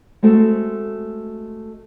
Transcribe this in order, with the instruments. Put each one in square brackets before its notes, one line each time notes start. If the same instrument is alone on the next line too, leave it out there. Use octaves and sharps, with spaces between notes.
[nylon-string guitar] G#3 A3 C4 F#4 A4